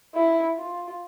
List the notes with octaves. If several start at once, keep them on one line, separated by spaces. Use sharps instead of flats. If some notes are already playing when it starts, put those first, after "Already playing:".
E4
F4